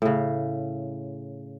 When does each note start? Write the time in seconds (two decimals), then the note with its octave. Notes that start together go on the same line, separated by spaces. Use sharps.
0.02 A2 C#3